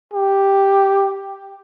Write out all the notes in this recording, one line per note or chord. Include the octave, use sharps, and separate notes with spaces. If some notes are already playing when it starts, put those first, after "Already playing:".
G4